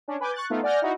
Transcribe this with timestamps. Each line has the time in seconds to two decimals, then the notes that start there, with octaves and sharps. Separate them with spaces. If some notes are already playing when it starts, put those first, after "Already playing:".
0.08 C#4 D4
0.20 B4 G#5 D6 G6
0.34 C#6 F#6 A6
0.50 A3 B3 D#4 F4
0.63 D5 F#5 G#5 F6 G6 A#6
0.82 D#4 E4 F#4